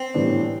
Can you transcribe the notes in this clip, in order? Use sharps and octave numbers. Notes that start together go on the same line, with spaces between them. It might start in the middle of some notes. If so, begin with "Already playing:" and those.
Already playing: C4
A2 E3 G3 B3 D4